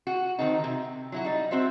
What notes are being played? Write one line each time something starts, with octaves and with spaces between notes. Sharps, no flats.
F#4
D#3 C4 D#4
C3
F#3 E4 F#4
G3 D#4
C4 F#4 C5 E5